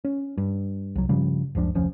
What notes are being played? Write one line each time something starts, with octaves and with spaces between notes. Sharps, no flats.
C#4
G2
C2 F#3
G2 C#3 F3 G3
F#1 C#2 F3 D4
F1 D2 F3 C#4